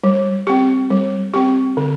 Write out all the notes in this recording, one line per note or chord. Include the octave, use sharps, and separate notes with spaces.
G3
C4 G4
G3
C4 G4
D3